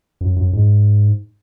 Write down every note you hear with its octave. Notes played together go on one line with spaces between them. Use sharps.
F#2
F#2
G#2